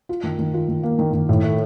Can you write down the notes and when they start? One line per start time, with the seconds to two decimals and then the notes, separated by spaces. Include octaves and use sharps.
0.09 F4
0.23 D#3
0.39 D#3
0.54 F4
0.69 D#3
0.83 A#3
0.99 D#3
1.13 D#3
1.29 A2
1.43 A3